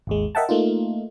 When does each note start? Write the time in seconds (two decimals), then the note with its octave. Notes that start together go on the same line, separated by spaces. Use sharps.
0.07 G#1 D#2 G#3
0.35 A#4 D#5 E5 F#5 G5 A5
0.49 A3 A#3 D#4 F4